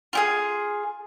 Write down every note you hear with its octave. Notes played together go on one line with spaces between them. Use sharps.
F4 G4 G#4